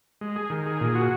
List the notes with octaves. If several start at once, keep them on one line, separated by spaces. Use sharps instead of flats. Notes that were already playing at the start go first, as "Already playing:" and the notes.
G#3
G#4
D#3
G#4
A#2
F#4